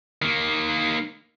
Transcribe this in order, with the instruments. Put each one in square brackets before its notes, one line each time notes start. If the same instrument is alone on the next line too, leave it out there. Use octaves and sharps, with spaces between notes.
[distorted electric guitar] D#3 A#3